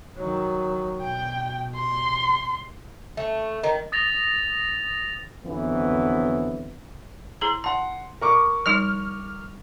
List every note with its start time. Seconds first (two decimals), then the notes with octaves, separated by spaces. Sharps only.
0.18 D#3 F#3
1.01 B2 G5
1.74 C6
3.17 A3
3.63 D#3
3.92 D#6 A6 A#6 F7
5.44 F2 D3 E3 F#3 B3
7.41 E4 G#4 A#5
7.64 F#5 A5 C6
8.21 A#4 C#6 D6
8.66 F3 G3 D#4 F6